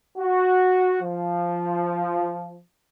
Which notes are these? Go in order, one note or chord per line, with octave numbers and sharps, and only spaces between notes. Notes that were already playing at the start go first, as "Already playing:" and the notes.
F#4
F3